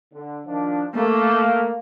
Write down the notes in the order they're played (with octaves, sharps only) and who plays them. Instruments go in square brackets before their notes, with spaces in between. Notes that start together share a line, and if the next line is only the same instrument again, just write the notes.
[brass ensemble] D3
D#3 F3 D4
[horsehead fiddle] A3 [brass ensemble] A#3